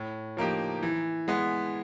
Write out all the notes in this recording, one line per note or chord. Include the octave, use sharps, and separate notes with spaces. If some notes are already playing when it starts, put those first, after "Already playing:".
Already playing: A2
F3 A#3 D#4 G4
E3
G#3 B3